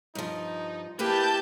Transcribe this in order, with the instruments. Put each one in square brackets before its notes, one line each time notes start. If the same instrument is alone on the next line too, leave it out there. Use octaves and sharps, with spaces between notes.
[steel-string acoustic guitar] G2 F3 [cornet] D#4
[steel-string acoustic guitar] A#3 E4 G#4 [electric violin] G4 [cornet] B4 [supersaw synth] A5 G6